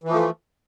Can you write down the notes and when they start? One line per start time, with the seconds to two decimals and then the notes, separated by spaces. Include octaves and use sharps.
0.04 E3
0.08 F3
0.13 A3